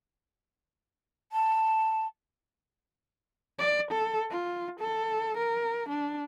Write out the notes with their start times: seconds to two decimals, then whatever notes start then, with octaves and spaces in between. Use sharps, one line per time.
1.32 A5
3.59 D5
3.91 A4
4.31 F4
4.80 A4
5.37 A#4
5.89 D4